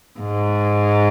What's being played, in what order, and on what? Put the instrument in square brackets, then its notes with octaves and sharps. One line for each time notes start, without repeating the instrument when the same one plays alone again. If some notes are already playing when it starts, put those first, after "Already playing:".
[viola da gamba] G#2